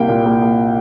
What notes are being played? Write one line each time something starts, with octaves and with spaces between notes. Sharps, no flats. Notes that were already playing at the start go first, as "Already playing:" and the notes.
Already playing: C2 A#3 G5
A#2
A#3
A#3